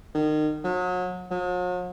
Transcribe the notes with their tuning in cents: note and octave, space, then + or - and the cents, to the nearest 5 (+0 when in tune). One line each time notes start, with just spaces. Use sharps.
D#3 -30
F#3 -35
F#3 -45